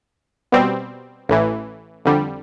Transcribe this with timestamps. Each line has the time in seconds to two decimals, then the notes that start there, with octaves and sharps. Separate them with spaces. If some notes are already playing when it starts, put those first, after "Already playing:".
0.52 B2 G3 C4
1.29 A1 A2 E3
2.05 F2 D3 G3